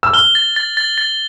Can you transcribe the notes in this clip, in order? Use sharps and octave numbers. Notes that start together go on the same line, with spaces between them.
E6
F6 G7
A6
A6
A6
A6